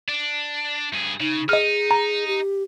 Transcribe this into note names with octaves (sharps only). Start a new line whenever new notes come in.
D4
G2 G#4
C#3 D#4
D#4 G#4 D#5 F6
A#5
G4